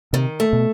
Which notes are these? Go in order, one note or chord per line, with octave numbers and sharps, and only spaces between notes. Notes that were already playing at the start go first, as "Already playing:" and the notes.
C3 D#3
A3
B2